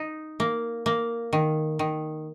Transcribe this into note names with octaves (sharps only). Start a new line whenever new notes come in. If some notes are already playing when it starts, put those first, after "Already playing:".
Already playing: D#4
A#3
A#3
D#3
D#3